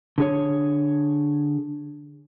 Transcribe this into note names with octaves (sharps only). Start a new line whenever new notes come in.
D3 G#4 C#5